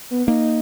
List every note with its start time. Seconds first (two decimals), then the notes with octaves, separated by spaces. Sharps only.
0.11 B3
0.27 A#3 D#4